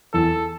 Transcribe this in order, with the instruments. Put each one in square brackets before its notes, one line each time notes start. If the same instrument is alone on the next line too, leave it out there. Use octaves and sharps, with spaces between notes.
[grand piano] E2 [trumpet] A4